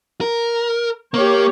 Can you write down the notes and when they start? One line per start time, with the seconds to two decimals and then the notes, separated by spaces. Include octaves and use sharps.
0.21 A#4
1.14 A#3 G4 C#5